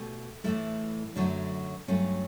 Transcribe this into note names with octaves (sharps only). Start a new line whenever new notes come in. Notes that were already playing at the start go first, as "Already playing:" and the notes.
Already playing: B2 A3 G4
A2 E3 A3 E4
F#2 D3 F#3 A3 D4
G2 F#3 A3 C#4